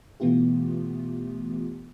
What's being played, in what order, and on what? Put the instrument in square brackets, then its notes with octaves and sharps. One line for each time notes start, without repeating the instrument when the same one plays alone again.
[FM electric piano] B2 E3 A3 B3 F4 G4